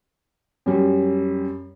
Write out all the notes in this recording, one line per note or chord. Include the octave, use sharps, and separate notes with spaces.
F#2 G3